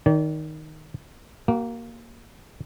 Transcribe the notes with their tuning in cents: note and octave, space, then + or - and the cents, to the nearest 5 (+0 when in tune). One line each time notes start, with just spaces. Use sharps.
D#3 +0 D5 -35
A#3 +0 F#4 +40